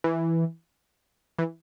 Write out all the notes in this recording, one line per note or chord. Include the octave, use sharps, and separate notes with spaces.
E3
E3